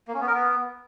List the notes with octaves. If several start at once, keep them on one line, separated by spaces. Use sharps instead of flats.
A#3
C#4
B3
A#4
B3